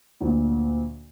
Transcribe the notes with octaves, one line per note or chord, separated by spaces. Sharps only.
D2 A#2